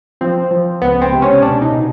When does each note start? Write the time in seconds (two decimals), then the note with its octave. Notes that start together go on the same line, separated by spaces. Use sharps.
0.21 F3 C4
0.51 F3
0.81 C#2 B3
1.02 C4
1.12 C3
1.22 C#4
1.42 B2 D4
1.62 D#4
1.72 B2